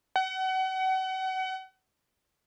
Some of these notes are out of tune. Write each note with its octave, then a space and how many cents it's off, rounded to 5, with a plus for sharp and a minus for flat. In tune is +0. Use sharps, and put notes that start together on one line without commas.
F#5 +35